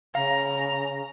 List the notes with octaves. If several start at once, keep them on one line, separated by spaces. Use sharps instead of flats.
C#3 F5 A#5